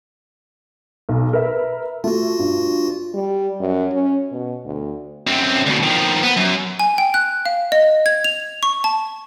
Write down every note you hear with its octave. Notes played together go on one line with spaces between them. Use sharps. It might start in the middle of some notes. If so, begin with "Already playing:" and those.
B1
A#4 B4 E5
A3 F4 F#4
G2
G3
F#2
C#4
B2
D2
F#2 C4
D2 B2
D#3 F3
B3
F#2
G#5
G5
F#6
F5
D#5
G#6
F7
C#6
A5